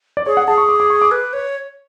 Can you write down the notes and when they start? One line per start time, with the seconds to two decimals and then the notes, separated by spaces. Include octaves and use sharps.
0.17 D5
0.26 G#4 C#5
0.37 F#5
0.48 G#4 A5
0.58 C#6
0.69 D6
0.80 D6
0.90 C#6
1.02 D6
1.12 B4
1.33 C#5